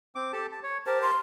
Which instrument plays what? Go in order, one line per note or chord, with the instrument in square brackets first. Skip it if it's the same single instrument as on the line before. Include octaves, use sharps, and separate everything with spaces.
[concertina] C4 D6
G4 A4 A5
A5
C#5
[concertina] G4 A#4 A5 [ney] C5
[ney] C6